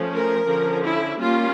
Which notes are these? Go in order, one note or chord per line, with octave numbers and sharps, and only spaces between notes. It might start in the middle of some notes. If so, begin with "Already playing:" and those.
Already playing: F3 A3 C#4
A#4
D3 F3 C#4
E4
G3 A#3 C#4 F4